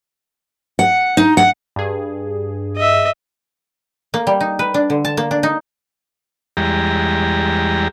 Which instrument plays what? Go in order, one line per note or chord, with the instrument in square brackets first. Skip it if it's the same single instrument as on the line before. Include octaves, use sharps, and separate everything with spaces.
[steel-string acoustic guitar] F#5
D#4
F#5
[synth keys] G2 G#4
[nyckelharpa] D#5 E5
[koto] A#3
G3
D#4
B4
D4
D3
A5
A#3
D4
D#4
[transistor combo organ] E2 G3 G#3 G4 A#5